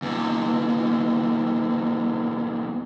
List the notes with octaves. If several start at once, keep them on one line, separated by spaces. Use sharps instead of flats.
E2 A#2